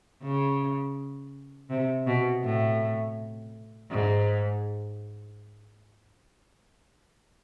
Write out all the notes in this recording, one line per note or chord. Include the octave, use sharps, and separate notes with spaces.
C#3
C3
B2
A2
G#2